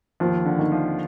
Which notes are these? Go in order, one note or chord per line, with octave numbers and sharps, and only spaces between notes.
D#2 F3
D3
D#3
F3